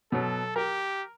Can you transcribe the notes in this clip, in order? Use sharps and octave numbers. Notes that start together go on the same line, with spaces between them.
B2 F#3 A4
G4 A#4